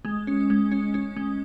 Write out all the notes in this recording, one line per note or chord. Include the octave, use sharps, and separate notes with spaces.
G#3
C#4
G#3
C#4
C#4
G#3